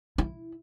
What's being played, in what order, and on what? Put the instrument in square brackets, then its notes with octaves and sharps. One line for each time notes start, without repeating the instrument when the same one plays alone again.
[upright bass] E4